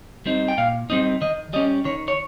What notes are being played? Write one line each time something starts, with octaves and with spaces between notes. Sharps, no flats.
G3 C4 D#4
G5
A#2 F5
G3 C4 D#4 D#5
D#3 D#5
G3 C#4 D#5
D#3 C#5
C#5